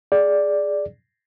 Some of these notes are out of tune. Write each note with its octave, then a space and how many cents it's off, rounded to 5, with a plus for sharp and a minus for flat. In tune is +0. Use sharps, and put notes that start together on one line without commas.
G#4 +0 D5 +0